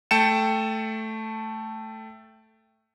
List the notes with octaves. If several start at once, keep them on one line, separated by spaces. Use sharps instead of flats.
A3 G5 A5 C#7 E7